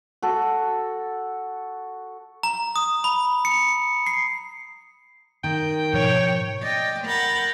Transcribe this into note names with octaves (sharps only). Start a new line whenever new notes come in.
F#4 A4
A#5
D#6
B5
C#7
C7
D#3 G5
G#2 B2 F3 C#5
D5 D#5 G5
A#4 F#5 B5 G6 A6